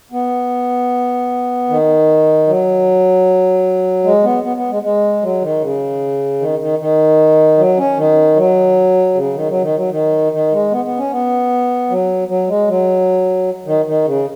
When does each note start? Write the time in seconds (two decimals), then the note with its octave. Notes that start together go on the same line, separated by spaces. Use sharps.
0.12 B3
1.69 D#3
2.47 F#3
4.04 G#3
4.24 B3
4.43 B3
4.57 B3
4.70 G#3
4.82 G#3
5.22 F#3
5.41 D#3
5.62 C#3
6.40 D#3
6.59 D#3
6.79 D#3
7.58 F#3
7.77 C#4
7.97 D#3
8.36 F#3
9.14 C#3
9.34 D#3
9.48 F#3
9.62 D#3
9.76 F#3
9.90 D#3
10.32 D#3
10.52 G#3
10.71 B3
10.85 B3
10.98 C#4
11.11 B3
11.90 F#3
12.28 F#3
12.48 G#3
12.68 F#3
13.65 D#3
13.85 D#3
14.05 C#3